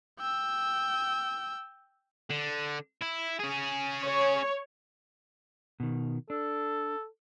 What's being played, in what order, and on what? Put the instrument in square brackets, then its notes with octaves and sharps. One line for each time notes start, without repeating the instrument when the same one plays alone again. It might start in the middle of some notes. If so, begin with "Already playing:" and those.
[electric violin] G5 E6
[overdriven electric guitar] D3
E4
C#4 G#4
[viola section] C#5
[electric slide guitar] B2 D#3
[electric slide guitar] D4 [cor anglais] A4